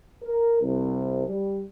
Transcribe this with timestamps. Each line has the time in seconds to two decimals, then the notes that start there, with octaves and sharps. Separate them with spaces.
0.22 A#4
0.60 C2
1.26 G3